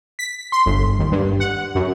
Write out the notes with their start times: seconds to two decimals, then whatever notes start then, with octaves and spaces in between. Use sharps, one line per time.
0.19 B6
0.52 C6
0.66 G1
0.99 D#2
1.12 G2
1.40 F#5
1.75 F#2